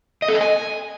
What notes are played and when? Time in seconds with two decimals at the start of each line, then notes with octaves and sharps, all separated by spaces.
0.22 D#5
0.29 A4
0.35 D#5
0.41 G#5